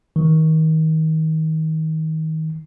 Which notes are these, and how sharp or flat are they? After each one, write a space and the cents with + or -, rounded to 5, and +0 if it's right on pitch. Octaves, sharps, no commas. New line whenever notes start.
D#3 +30